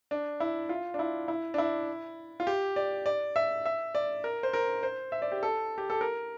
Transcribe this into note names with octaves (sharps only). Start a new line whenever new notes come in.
D4
E4
F4
D4
E4
E4
D4
E4
F4
G4
D5
D5
E5
E5
D5
A#4
C5
A#4
C5
E5
D5
G4
A4
G4
A4
A#4